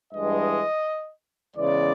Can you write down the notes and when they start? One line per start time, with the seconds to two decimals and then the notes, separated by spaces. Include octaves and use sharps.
0.14 G2 E3 G#3 D#5
1.55 E2 C#3 E3 G#3 D5